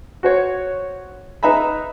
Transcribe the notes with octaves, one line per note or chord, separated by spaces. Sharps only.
F#4 C5 C#5
D#4 B4 E5 A#5 B5